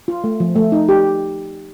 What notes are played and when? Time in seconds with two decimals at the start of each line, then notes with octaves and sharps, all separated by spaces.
0.08 F4
0.24 A3
0.40 F3
0.56 A3
0.72 D#4
0.89 G4